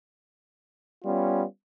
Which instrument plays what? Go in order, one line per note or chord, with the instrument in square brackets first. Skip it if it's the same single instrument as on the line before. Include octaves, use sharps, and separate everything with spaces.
[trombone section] G3 B3 C#4 F4